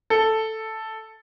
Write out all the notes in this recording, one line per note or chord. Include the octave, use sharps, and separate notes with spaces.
A4